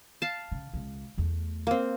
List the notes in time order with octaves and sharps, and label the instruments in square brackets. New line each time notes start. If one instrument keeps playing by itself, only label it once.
[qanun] F5 A5
[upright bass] C#3
C#2 C#3
E2 A3
[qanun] A#3 C4